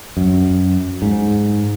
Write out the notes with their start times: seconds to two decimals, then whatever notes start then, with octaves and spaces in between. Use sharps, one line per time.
0.17 F#2
1.02 G#2